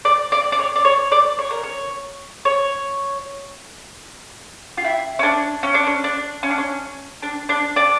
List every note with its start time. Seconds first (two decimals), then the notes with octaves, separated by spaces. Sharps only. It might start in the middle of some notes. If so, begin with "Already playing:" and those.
0.05 D5
0.32 D5
0.52 D5
0.59 C#5
0.76 D5
0.85 C#5
1.12 D5
1.39 C#5
1.51 A#4
1.64 C#5
2.45 C#5
4.78 F4
4.84 E4
5.19 C#4
5.23 D4
5.63 C#4
5.74 D4
5.87 C#4
6.04 D4
6.43 C#4
6.50 D4
6.58 C#4
7.23 D4
7.49 D4
7.76 D4